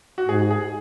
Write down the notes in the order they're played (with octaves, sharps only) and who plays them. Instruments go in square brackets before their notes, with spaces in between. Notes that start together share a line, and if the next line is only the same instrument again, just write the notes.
[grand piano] F#4
[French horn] G#2 [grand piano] G#4
[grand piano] G#4